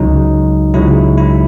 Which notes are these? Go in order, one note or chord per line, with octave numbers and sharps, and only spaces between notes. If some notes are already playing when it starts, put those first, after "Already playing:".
Already playing: C#2 C#3 F#3 D#4
C#2 C#3 F#3 E4
E4